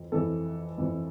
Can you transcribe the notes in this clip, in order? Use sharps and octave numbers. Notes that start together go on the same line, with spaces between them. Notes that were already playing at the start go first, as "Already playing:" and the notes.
Already playing: F2 E3
F2 E3 A4
F2 E3